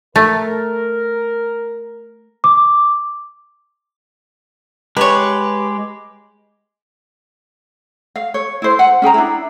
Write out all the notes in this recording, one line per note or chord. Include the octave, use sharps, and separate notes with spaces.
A3 A#4
D6
G#3 G4 B4 C#5
F5
C#5
E4 C5
F#5
C#4 G#4 G5 A#5
D4 E4